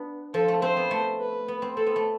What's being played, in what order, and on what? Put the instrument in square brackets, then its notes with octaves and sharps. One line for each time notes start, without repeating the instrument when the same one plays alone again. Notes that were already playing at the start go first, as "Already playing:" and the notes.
Already playing: [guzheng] B3 D4
[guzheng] F3 [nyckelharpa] A4
[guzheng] A3
[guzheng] C4 [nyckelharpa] C5
[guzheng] B3
A3
[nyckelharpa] B4
[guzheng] B3
C4
[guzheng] C4 [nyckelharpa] A4
[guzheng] B3
A3